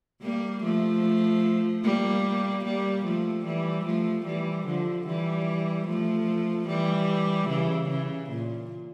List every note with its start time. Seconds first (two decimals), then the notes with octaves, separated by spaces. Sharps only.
0.22 G3 A#3
0.63 F3 A3
1.84 G3 A#3
2.65 G3 A#3
3.05 F3 A3
3.45 E3 G3
3.85 F3 A3
4.26 E3 G3
4.66 D3 F3
5.07 E3 G3
5.87 F3 A3
6.68 E3 G3
7.49 C#3 E3
7.89 C#3
8.30 A#2